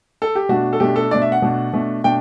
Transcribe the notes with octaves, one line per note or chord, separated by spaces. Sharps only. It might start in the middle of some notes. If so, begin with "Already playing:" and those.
A4
G4
B2 A3 D4 F#4
A4
B2 A3 D4 G4
A4
B2 A3 D4 D5
E5
F#5
B2 A3 D4
B2 A3 D4
B2 A3 D4 G5